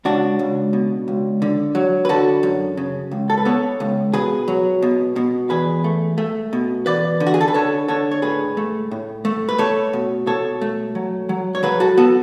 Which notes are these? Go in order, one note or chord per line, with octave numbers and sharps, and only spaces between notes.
C#2 D4 F#4
C#2
B2
C#2
D3
F#3
B4
D3 F#4 A4
F#2
C#3
C#2
A4
B4
B3 A4 C#5
C#2
B2 G#4 B4
F#3
B2
B2
E2 G#4 B4
A3
A3
B2
E2 B4 D5
D3
F#4
G#4
A4
B4
D3 A4 C#5
D3 A4 C#5
C#5
A2 G#4 B4
A3
A2
A3
B4
A3 A4 C#5
B2
B2 A4 C#5
A3
F#3
F#3
C#5
F#3 G#4 B4
F#4 A4
B3 F#4 A4